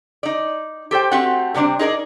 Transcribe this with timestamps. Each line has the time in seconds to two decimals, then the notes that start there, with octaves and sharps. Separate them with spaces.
0.23 D#4 D5
0.91 G4 A4 C5 G5
1.11 A3 C4 F#4 G4 F#5
1.54 A2 C3 G3 C4 D4
1.79 D#4 G#4 A#4 D5